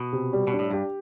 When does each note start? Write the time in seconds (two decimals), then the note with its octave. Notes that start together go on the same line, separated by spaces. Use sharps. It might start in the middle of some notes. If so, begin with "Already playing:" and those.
Already playing: B2
0.13 C3
0.33 G3
0.47 B2
0.53 D4
0.59 A2
0.71 G2 G4